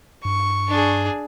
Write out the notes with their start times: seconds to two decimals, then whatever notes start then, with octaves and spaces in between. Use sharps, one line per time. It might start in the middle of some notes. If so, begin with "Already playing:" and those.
0.25 G2 C#6
0.68 D4 G#4